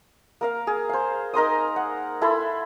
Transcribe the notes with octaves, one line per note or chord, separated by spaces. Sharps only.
A#3 A#4 F5
G#4
C5 F5
D#4 A#4 C6 D#6
F#5
E4 A4 B5 C6